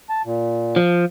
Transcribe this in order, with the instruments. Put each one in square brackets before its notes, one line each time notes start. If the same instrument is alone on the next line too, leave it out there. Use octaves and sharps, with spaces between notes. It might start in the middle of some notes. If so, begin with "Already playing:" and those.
[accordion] A5
A#2
[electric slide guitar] F3